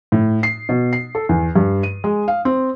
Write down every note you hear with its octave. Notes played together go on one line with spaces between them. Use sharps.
A2
C7
B2
C7
A4
E2
G2
D#7
G#3
F5
C4